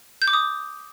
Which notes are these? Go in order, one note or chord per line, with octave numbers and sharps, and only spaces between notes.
G6
D6
D#6